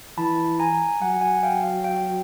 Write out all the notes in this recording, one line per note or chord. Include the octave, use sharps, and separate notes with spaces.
E3 A5 B5
G#5 A#5
F#3 F#5 G#5
F#5 G#5
F5 G5
F5 G5
F5 G5